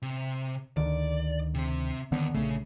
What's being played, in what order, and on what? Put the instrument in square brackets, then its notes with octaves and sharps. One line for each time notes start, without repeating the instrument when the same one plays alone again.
[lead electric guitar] C3
[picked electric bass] D2 D3 D#3 [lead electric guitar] D5
[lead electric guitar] C3 C4
[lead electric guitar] D#2 [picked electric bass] D3 B3
[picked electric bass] A#1 A3 [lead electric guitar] C#3